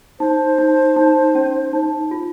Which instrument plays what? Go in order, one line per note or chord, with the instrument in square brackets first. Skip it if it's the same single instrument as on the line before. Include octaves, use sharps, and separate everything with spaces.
[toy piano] D#4 [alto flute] C5
[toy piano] D#4
D#4
C#4
D#4
F4